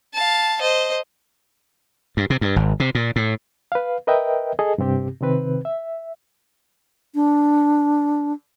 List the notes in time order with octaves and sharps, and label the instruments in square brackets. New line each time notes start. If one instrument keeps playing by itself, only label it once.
[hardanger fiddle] F5 A5
C5 D#5
[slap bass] G2
C3
G2
G#1
C3
A#2
A2
[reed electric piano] B4 F5
A#4 B4 D#5 E5 G5
G#4 A4 D#5
G2 C3 C4 G4
C3 D#3 C4 B4
E5
[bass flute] D4